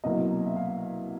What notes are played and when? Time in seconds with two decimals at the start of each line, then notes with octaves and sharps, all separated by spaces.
0.04 C2 B2 F#3 A#3 D#5
0.46 E5
0.56 F5